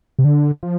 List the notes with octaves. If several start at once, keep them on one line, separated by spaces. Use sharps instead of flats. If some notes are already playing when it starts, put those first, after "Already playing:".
C3
D3
F3